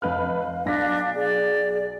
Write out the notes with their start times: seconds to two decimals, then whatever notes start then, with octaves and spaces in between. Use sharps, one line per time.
0.02 F1 B4 F5 F6
0.65 B1 D4 A#6 B6
1.16 G#4 D5